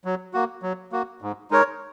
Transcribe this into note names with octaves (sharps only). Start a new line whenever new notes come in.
F#3
A#3 F#4
F#3
A#3 F#4
G#2
G#3 D#4 A#4 C#5